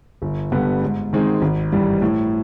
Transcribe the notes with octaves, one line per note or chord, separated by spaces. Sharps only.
G1
G2 D3 G3 B3
G#2
D#3 G#3 C4 D#4
G#1
G2 E3 G3
A2